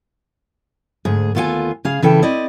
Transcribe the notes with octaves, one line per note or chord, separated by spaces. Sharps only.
D2 G#2 G#4
D#2 B3 F4 F#4 A4 G#5
C#3 G#4 F5
C#3 E3 A4 G5
C4 E4 D5 D#5